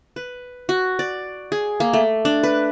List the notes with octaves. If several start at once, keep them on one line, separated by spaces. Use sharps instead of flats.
B4
F#4
D5
G#4
A#3
A3
D4
B4